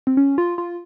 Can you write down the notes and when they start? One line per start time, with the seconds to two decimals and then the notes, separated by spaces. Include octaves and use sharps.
0.07 C4
0.17 C#4
0.38 F4
0.58 F4